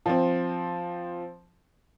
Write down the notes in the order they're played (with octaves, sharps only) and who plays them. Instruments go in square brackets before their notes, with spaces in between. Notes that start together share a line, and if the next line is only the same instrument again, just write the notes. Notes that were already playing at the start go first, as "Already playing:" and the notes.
[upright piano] F3 C4